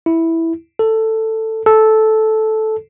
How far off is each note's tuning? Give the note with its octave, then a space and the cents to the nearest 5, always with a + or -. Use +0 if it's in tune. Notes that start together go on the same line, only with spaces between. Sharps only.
E4 -5
A4 +10
A4 -10